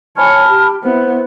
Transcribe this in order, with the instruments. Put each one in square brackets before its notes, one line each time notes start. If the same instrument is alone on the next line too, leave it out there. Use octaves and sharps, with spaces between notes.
[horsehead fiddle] C#5 G#5 [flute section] A5 B5 F6
[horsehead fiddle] G4
[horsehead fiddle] B3 E4 [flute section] C5